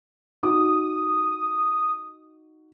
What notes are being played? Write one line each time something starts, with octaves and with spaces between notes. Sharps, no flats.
D#4 F#4 D6 D#6